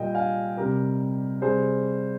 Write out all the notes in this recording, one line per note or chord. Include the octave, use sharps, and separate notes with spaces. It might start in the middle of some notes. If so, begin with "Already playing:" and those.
Already playing: A#2 G3 D#5 G5
F5 G#5
C3 G3 G4 A#4
C3 G3 G#4 C5